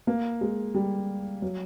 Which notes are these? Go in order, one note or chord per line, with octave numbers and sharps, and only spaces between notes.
A#3
G#3
G3
F#3